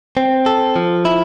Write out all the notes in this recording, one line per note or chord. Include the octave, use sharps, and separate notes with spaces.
C4
A4
F3
E4